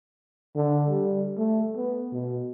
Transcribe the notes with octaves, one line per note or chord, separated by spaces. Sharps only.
D3
G3
A3
B3
B2